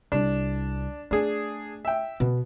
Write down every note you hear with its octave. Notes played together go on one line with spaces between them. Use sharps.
C2 D4
A3 D4 G#4
E5 G5
B2 B3